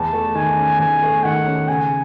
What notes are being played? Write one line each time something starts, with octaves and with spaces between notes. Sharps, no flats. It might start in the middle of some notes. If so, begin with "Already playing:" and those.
Already playing: E2 A5
A3
D#3 G#5
C#4
E2 G#5
A3
D#3 F#5
C#4
C#3 G#5